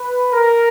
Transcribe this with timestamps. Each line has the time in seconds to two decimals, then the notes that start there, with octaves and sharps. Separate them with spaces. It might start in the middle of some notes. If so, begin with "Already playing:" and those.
Already playing: B4
0.33 A#4